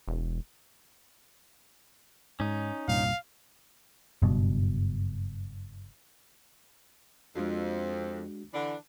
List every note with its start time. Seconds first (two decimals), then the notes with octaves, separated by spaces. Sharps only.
0.08 E1
2.40 G#2 C#4 D#4
2.88 C2 G2 A#2 F5
4.22 F#1 G2 B2
7.36 F2 G#3 D4 F#4
8.54 D3 E3 D4